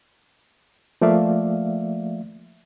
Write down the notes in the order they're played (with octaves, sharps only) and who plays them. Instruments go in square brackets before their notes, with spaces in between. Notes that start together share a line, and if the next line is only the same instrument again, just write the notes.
[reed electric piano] F3 A3 A#3 D5 E5 F5